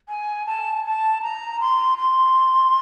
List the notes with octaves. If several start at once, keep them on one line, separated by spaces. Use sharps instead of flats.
G#5
A5
A5
A#5
C6
C6